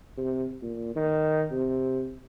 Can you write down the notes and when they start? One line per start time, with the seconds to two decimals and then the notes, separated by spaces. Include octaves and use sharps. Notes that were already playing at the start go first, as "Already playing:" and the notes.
0.17 C3
0.62 A#2
0.96 D#3
1.51 C3